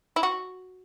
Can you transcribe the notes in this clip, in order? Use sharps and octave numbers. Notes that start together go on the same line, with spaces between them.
E4
F#4